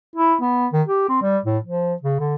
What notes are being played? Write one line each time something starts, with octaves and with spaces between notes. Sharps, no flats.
E4
B3
D#3
G4
C4
G3
A2
F3
C#3
D3